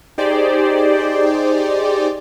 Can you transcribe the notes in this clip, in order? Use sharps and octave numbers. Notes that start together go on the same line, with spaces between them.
D#4 G4 G#4 C5 D5